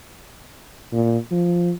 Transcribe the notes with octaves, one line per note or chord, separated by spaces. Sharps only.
A#2
F3